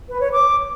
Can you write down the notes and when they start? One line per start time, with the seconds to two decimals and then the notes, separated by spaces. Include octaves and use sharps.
0.09 B4
0.21 C#5
0.32 D6